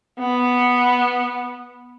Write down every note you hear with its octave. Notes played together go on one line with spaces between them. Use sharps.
B3